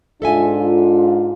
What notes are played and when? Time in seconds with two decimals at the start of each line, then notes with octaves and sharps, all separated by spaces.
0.22 G#2 D4 F4 A4 E5 G#5